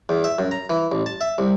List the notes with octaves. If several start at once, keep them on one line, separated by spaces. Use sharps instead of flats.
E2
E5
F#2
A#5
E3
A1
A5
E5
C2